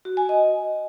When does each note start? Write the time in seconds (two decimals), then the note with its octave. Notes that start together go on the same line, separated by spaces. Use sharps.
0.05 F#4
0.17 G#5
0.29 D#5